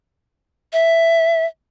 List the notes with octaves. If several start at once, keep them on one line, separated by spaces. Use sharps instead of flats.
E5